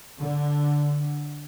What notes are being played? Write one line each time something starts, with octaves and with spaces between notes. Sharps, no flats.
D3